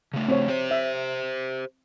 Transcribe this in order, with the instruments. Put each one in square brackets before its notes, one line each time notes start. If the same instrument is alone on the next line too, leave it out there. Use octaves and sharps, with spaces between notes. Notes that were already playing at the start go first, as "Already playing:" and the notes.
[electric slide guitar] C#3 A3
[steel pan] C4 C#5
[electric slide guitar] G4 C5
[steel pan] E5